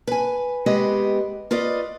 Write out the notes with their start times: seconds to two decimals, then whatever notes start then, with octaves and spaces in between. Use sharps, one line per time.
0.07 B4 G#5
0.66 G#3 B3 C4 G4 B4 D#5
1.51 F4 B4 D5 D#5